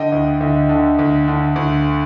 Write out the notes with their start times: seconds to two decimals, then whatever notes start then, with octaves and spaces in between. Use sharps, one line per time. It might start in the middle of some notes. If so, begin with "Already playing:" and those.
Already playing: D3 D#5 G5
0.12 D2
0.40 D2
0.69 D3
0.99 D2
1.28 D3
1.56 D2